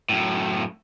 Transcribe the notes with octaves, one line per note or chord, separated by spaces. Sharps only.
F#2 A2